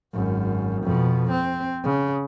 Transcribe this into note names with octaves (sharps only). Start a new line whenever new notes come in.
G#1 F#2
F2 B2
C4
C#3